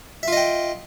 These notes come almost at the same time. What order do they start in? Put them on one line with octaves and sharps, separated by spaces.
E5 F4 D#5 G5